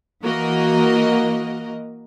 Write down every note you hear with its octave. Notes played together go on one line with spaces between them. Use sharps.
E3 A#3 F#4 A#4 D#5